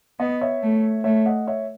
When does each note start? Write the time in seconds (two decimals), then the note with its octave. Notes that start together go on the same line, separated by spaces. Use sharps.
0.20 B3 D#5 F#5
0.41 C#5 E5
0.62 A3
1.04 A3 C#5 E5
1.26 D#5 F#5
1.47 C#5 E5